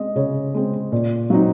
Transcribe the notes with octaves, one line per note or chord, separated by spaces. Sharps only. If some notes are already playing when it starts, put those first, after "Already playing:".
Already playing: G#3 C4 D#5
C#3 C#5
G#3 C4
A#2
F#3 C4 D#4